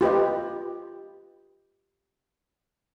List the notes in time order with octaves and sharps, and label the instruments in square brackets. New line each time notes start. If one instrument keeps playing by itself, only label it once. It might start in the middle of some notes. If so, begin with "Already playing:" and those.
[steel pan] F4 G4 B4 D#5